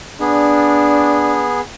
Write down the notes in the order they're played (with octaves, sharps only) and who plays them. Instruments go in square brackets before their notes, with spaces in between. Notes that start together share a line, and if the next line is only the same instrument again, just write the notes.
[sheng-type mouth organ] B3 G#4 [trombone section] D4